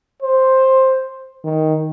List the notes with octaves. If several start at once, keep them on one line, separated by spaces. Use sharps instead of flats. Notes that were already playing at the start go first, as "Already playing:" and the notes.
C5
D#3